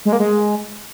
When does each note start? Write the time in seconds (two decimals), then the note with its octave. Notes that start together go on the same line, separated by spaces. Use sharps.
0.05 G#3
0.12 A#3
0.20 G#3